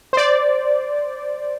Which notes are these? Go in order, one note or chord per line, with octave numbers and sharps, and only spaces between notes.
C5 D5